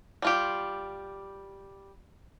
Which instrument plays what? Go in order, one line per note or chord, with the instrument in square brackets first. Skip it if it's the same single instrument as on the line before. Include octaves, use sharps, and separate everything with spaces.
[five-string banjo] G3 F4 G4